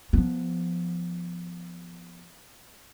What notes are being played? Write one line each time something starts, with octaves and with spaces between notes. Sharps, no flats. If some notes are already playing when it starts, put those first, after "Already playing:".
F3 B3